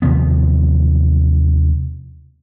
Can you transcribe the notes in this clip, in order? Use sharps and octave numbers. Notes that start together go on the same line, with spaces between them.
D#2 C3 F3 B3